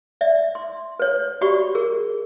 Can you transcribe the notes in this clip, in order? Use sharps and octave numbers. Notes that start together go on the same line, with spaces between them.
D5 E5
C6
B4 C#5
F#4 G4 D5 B5 C#6
G#4 A#4